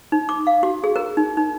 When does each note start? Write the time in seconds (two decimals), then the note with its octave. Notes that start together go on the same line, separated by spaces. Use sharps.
0.12 D#4
0.29 D6
0.47 F5
0.63 F#4
0.84 G#4
0.96 A#4
1.17 D#4
1.37 D#4